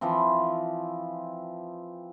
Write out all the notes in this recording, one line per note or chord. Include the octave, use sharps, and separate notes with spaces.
E3 F3 C4